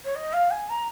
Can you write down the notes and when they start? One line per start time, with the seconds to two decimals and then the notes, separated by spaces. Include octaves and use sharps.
0.05 C#5
0.16 D#5
0.33 F5
0.51 G#5
0.69 A#5